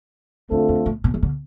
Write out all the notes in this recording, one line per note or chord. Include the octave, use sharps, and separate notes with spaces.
E2 D3 A3 C4 F4 A4
F2
A2
B2
E3
D3